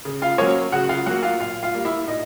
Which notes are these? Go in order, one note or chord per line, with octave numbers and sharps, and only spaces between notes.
C#3
F4 F5
F#3 A#3 C#4 C#5
C#3 F#4 F#5
F4 F5
F#3 A#3 F#4 F#5
F4 F5
A#2 F4 F5
F4 F5
G3 A#3
E4 E5
A#2 D#4 D#5